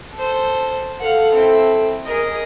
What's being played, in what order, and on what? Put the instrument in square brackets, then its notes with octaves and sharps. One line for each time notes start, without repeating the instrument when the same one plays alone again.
[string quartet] A4 C5
[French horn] A4 [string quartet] F5 F#5
[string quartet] C4 E4
G#4 A#4 D#5